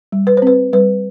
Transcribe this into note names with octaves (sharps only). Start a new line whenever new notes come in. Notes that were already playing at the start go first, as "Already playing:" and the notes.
G3
B4
C5
C4 B4
G3 B4